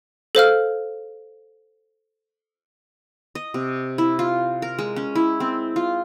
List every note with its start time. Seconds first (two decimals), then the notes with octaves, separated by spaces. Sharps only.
0.35 A4 C5 F5 F6
3.35 D#5
3.54 C3
3.98 E4
4.19 F4
4.62 A#4
4.79 G#3
4.96 C#4
5.15 E4
5.40 C4
5.76 F4